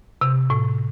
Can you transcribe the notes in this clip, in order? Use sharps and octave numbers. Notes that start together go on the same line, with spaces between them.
C3
A2